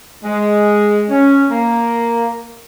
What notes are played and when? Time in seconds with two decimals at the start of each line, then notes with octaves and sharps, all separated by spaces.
0.23 G#3
1.10 C#4
1.50 A#3